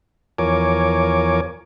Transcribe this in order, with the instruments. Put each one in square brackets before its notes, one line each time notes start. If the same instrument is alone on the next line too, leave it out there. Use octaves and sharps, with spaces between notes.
[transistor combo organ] E2 F3 A#4 C#5 G#5 D6